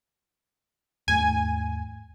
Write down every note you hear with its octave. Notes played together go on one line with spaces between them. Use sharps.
D#2 G#2 A3 G#5